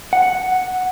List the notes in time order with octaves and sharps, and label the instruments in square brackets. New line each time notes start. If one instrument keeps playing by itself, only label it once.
[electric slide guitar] F#5